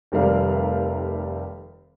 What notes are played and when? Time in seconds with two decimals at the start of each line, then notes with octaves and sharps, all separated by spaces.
0.12 F1 D#3 G3 A3 A#4 F5